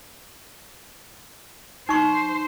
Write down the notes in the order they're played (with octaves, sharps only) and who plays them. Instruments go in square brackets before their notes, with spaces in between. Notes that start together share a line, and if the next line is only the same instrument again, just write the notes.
[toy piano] D#4 C#6 [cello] C5